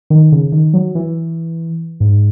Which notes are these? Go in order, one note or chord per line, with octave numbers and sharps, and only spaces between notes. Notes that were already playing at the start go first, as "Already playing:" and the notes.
D#3
C#3
D#3
F#3
E3
G#2